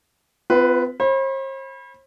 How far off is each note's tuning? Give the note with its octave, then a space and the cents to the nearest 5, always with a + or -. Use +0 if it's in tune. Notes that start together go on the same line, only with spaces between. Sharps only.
C4 -45 F4 -10 B4 +0
C5 +45 B5 -15